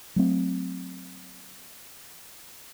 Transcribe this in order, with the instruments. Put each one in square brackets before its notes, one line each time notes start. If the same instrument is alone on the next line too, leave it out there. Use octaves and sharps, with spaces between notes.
[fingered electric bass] F#3 A3 C4